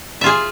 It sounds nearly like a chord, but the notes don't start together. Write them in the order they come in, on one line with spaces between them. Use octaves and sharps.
E5 F4 G#4